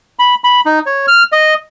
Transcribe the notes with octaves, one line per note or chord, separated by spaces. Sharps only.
B5
B5
D#4
C#5
F6
D#5